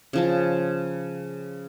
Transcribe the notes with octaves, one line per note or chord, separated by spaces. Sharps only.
C#3 F3 A5